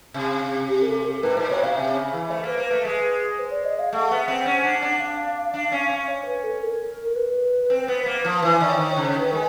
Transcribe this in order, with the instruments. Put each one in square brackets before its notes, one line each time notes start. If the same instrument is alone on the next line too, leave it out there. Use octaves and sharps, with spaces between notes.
[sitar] C3
[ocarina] G4
A#4
A4
A4
A#4
[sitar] G#2 [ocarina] B4
[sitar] A#2 [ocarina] C5
[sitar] B2 [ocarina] C#5
[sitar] B2 [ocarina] F5
[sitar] C3 [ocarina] E5
[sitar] C#3
E3
[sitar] A3 [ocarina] C5
[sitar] A#3
[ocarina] B4
[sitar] A#3
[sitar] A3 [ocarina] B4
[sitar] G#3
[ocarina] C5
D5
D#5
F5
[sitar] A3 [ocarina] F#5
[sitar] B3
C4
C#4
D4
D4
[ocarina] F5
[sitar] D4
C#4
C#4
[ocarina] C#5
B4
A4
A#4
A#4
B4
[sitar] C4
B3
A#3
F3
E3
[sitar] D#3 [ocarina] D5
[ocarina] C#5
[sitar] D#3 [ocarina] C5
[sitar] C#3 [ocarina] C#5
[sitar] D#3 [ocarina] B4
[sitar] G#3 [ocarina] A#4